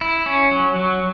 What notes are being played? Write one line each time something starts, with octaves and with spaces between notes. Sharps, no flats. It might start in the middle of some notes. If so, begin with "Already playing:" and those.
E4
C#4
F#3
F#3